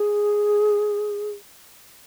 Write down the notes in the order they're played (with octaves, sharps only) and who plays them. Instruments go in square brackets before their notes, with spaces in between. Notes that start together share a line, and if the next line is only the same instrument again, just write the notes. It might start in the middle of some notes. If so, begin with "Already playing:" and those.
Already playing: [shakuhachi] G#4